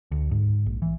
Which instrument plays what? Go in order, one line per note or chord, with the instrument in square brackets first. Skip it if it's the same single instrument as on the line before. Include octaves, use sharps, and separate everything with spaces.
[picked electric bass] D2
G#2
A#1
E3